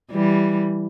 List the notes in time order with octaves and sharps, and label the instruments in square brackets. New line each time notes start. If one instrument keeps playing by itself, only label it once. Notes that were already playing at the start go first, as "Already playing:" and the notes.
[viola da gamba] E3 G3